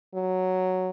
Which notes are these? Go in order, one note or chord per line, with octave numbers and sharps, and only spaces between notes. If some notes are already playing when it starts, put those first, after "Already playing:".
F#3